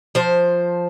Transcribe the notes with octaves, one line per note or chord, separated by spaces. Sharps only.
F3 C5